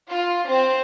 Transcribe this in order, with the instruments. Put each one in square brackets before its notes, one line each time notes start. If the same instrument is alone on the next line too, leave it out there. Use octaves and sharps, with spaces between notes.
[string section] F4
C4